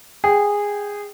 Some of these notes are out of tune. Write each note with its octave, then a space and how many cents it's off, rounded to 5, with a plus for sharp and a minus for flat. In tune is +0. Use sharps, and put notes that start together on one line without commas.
G#4 -15 G5 +0